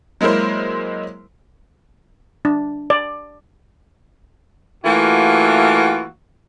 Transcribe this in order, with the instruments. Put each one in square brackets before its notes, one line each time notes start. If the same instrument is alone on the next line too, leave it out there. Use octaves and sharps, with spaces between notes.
[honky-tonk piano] F#3 G#3 A#3 E4 A#4 C5
[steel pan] D4
D5
[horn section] E3 A3 A#3 F4 F#4